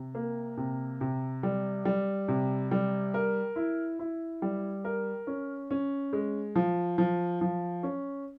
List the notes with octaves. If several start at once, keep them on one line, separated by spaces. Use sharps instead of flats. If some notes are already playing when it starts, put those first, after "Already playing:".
Already playing: C3
A#3
C3
C3
G3
G3
C3
G3
A#4
E4
E4
G3
A#4
C#4
C#4
G#3
F3
F3
F3
C#4